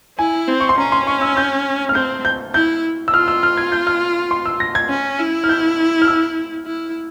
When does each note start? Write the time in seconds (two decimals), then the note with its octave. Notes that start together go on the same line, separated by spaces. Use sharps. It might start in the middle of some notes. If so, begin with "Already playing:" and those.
0.18 E4 G#5
0.48 C4
0.60 C#6
0.69 C6
0.78 C#4 A#5
0.92 C6
1.07 C#6
1.22 E6
1.37 G6
1.89 F6
1.95 C4 G6
2.25 G6
2.54 E4 G6
3.08 E6
3.13 F4 F6
3.28 E6
3.43 F6
3.57 G#6
3.72 G6
3.87 F6
4.31 C6
4.46 E6
4.60 A#6
4.75 G#6
4.89 C#4
5.19 E4
5.44 F6
5.49 G6
6.02 F6
6.08 E6
6.66 E4